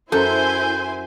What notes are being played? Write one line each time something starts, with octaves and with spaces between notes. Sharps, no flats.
F#2 E4 A4 C5 G#5 G6